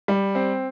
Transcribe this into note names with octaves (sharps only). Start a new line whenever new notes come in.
G3
C4